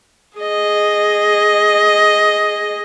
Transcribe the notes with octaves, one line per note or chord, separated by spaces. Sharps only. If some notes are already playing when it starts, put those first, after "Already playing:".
G#4 D#5